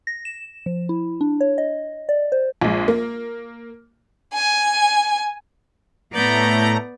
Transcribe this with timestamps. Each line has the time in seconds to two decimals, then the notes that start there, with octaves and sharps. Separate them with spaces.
0.07 A#6
0.25 E7
0.66 F3
0.89 E4
1.21 D4
1.41 C#5
1.58 D#5
2.09 D5
2.32 C5
2.61 A#1 G#3
2.88 A#3
4.34 G#5
6.13 A2 A3 B3 D5 A#5 G6